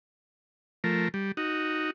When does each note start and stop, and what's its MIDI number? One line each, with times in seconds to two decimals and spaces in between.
0.84 1.08 53
0.84 1.08 57
0.84 1.08 70
1.14 1.32 55
1.37 1.90 63
1.37 1.90 66